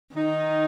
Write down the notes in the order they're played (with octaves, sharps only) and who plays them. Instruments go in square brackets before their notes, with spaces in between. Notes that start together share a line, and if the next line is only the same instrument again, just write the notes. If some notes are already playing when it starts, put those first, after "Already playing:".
[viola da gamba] D#3 [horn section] D#4